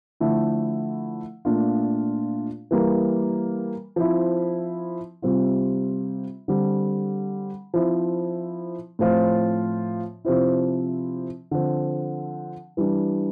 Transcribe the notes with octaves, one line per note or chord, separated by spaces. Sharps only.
D3 F3 A3 E4
A#2 A3 D4 F4
E3 G3 A#3
F3 C4 E4
C3 G3 C4 F4
D3 G3 C4
F3 C4 E4
A2 F3 C4 F4
C3 F3 C4 E4
D3 F3 C4
E3 G3 D4